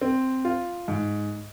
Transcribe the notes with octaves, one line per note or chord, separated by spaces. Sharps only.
C4
F4
G#2